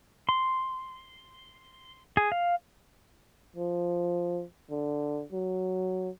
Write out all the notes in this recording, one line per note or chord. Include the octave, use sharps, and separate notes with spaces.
C6
G#4
F5
F3
D3
F#3